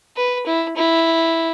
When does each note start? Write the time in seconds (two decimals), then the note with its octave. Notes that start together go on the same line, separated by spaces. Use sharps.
0.17 B4
0.46 E4
0.76 E4